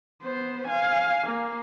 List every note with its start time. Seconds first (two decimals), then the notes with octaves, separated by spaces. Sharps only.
0.23 B3 C5
0.68 F5 G#5
1.27 A#3